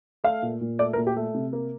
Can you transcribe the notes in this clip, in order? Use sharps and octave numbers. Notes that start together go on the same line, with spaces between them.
A3 F5
A#2
A#2
A3 D5
A#4
A#2
G4
A3
C3
A#3